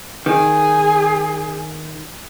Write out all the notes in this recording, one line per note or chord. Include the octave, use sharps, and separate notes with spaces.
D#3 G#4